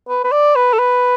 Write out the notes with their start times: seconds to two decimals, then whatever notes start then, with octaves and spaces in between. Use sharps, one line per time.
0.09 B4
0.24 B4
0.32 D5
0.56 B4
0.73 A4
0.79 B4